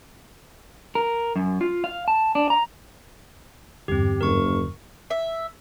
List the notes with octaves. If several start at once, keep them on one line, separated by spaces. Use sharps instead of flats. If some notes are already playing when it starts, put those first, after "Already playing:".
A#4
F#2
F4
F5
A5
D4
A#5
E2 G2 D3 C4 G4
F#1 A#4 C#6
E5